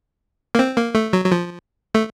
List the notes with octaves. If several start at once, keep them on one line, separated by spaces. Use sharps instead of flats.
A#3
C4
A#3
A3
F#3
F#3
F3
A3